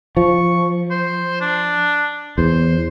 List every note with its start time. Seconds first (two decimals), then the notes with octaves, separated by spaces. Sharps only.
0.17 F3 C#6
0.91 C5
1.41 D4
2.38 E2 C5